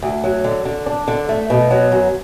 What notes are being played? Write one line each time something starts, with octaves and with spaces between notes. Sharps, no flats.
D2
F#3
D3
D3
D4
D3
A3
B2
F#3
F#2